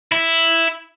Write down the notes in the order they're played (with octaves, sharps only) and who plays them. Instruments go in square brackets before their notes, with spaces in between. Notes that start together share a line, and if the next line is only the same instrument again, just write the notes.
[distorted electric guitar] E4